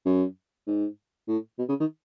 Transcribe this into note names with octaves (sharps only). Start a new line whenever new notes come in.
F#2
G#2
A2
B2
C#3
D#3